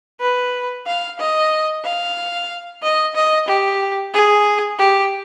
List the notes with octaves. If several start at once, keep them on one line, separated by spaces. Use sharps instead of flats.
B4
F5
D#5
F5
D#5
D#5
G4
G#4
G4